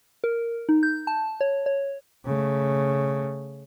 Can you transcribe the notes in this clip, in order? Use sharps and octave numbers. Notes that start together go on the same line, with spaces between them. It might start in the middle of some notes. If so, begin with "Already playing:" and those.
A#4
D#4
G6
A5
C#5
C#5
C#3 A3